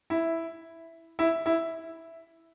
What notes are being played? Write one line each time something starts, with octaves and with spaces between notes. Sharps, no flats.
E4
E4
E4